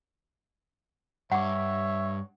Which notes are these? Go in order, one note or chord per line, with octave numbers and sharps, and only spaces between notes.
G2 C#5 E5 F#5 D6